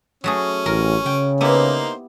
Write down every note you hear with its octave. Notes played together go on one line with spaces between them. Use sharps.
F#3 A3 C#4 G#4
A1 A#4
C#3 G5
A#3 B3 D#4 E4 G4 C5